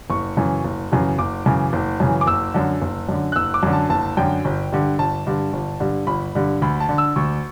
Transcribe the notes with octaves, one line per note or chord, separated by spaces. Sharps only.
F#1 C#6
F#2 C#3 E3
F#1
F#2 C#3 E3
F#1 D6
F#2 C#3 E3
F#1
F#2 C#3 E3
D6
F#1 E6
F#2 D3
F#1
F#2 D3
F#6
F#1 E6
D6
F#2 D3
A5
F#1 A5
F#2 D3 G5
G1
G2 D3
G1 A5
G2 D3
G1
G2 D3
G1 B5
G2 D3
D2 B5
A5
D3
E6
D2 C#6